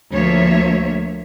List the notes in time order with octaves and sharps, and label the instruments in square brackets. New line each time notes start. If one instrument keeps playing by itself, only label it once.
[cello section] D2 F3 A#3 C#5 E5